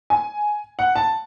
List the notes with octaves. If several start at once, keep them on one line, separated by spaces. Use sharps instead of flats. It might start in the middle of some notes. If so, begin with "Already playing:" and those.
G#5
F#5
A5